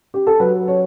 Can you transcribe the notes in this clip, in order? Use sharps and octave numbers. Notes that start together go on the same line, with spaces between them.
G4
A4
F#3 B4
C#5